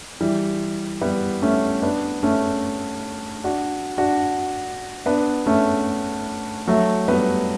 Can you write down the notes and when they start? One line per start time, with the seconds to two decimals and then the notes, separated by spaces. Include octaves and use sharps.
0.21 E3 G3
1.01 G3 B3
1.42 A3 C#4
1.82 B3 D4
2.23 A3 C#4
3.44 D4 F#4
3.98 D4 F#4
5.06 B3 D4
5.46 A3 C#4
6.67 F#3 A3
7.08 G3 B3